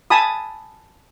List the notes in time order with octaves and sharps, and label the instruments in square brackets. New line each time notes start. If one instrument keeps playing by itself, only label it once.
[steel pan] G#5 A5 B5 D#6